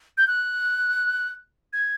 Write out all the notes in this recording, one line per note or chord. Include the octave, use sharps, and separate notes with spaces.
G6
F#6
G#6